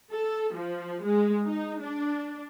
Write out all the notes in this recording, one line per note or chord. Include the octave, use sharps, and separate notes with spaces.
A4
F3
G#3
D#4
D4